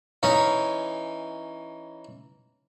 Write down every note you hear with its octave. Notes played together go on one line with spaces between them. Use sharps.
E3 C#4 D#4